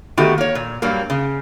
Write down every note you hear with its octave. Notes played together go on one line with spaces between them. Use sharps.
D#3 A3 B3 F#4 G4
A#3 C#5
A#2
G2 F#3 G3 A#3
C#3